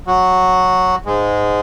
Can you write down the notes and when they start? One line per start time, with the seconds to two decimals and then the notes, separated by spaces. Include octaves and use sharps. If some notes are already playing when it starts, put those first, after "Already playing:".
0.07 F#3 F#4
1.06 G#2 G#3